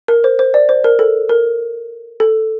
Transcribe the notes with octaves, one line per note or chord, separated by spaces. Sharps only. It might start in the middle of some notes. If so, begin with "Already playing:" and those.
A#4
C5
C5
D5
C5
A#4
A4
A#4
A4